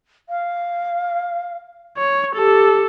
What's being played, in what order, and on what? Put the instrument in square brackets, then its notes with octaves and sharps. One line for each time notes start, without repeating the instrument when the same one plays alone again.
[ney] F5
[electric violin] C#5
[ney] G4 [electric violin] A4